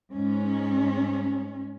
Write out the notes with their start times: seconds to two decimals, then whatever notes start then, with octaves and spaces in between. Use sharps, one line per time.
0.12 G#2 G#3 C#4